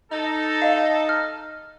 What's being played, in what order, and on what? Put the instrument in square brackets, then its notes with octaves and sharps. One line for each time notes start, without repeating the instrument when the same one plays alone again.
[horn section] D#4 A4
[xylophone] D#5 F5
F6